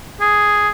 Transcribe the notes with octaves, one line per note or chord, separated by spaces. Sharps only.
G#4